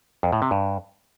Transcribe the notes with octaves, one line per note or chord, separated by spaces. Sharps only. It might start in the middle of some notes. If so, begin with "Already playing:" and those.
F2
A2
C3
G2